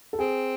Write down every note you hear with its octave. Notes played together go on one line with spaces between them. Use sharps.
A4
C4 G#4